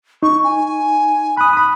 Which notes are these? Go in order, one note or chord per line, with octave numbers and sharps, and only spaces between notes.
D#4 C#6
G#5
B5 D#6 F#6
B5 D#6